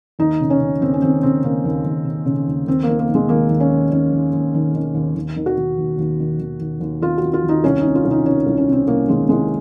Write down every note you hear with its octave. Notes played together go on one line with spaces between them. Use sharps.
D#2 D#4
C#3
C#4
C#3
D#2 C4
C#4
D#2 C4
C#3 C4
C#3 A#3
D#2
D#2
C#3
C#3
D#2
D#2 C4
D#3 A#3
A#3
D#3
G#3
D#2 A#3
D#2
C#4
D#3
D#3 C#4
D#2
D#2
D#3
D#3
D#2
D#2
D#3
F#4
D#3
D#2
D#2
D#3
D#3
D#2
D#2
D#3 F4
D#3 F#4
F4
D#2
D#4
C2 C#4
D#4
C3
F4
C2
D#4
D#3 C#4
C2
C#4
C3 C4
C2 A#3
D#3 G#3
C2 G#3